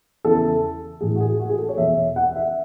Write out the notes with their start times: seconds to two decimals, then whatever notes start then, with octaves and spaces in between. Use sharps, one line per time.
0.25 E2 C#3 E3 A4
1.01 A2 E3 G#4
1.16 F#4
1.20 G#4
1.40 F#4
1.49 G#4
1.58 A4
1.69 C#5
1.77 E2 B2 E5
2.16 F#5
2.36 E5